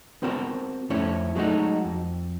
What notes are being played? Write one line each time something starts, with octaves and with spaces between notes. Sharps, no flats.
B3 C4 F#4 A#4 C5
F2 A3 C#4 E4 C#5
F#3 G#3 A3 C4 D#4 F#4
F2